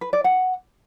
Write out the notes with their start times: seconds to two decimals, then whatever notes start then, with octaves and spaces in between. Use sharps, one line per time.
0.01 B4
0.13 D5
0.24 F#5